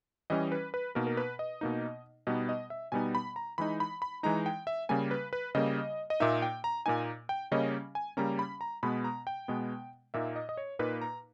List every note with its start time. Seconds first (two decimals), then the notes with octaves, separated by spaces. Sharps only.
0.30 E3 G3 C#4 D#5
0.52 B4
0.74 B4
0.95 B2 A#3 D#4 A#4
1.07 A#4
1.17 B4
1.39 D#5
1.61 B2 A#3 D#4
2.27 B2 G3 B3 D#4 D#5
2.49 D#5
2.70 E5
2.92 B2 G3 B3 D#4 G#5
3.15 B5
3.36 A#5
3.58 E3 G#3 D#4 B5
3.80 B5
4.02 B5
4.23 E3 G#3 D#4 A#5
4.46 G5
4.67 E5
4.89 C#3 G3 A#3 G#5
5.11 B4
5.33 B4
5.55 C#3 G3 A#3 D#5
6.10 D#5
6.20 A#2 A#3 D#4 E5
6.42 G5
6.64 A#5
6.86 A#2 A#3 D#4 G#5
7.29 G5
7.52 C#3 G3 A#3 C#4 D#5
7.95 G#5
8.17 C#3 G3 A#3 C#4 A#5
8.39 B5
8.61 A#5
8.83 B2 G#3 B3 B5
9.04 A#5
9.27 G5
9.48 B2 G#3 B3
10.14 A#2 A#3 D#4 E5
10.36 D#5
10.49 D#5
10.57 C#5
10.79 A#2 A#3 D#4 B4
11.01 A#5